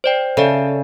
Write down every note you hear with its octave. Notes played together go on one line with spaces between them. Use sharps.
C5 D5 G5
C#3 A4 D5 E5